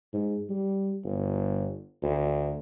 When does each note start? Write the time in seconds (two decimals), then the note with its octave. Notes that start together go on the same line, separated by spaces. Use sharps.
0.13 G#2
0.49 G3
1.04 G1
2.03 D2